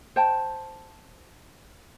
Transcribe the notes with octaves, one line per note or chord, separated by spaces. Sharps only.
C5 G5 A5